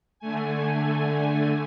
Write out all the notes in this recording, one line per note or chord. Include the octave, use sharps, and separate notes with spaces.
D3 A3 G#5